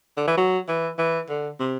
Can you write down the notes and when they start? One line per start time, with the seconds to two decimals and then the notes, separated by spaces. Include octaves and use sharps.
0.17 D3
0.27 E3
0.37 F#3
0.68 E3
0.98 E3
1.29 D3
1.59 C3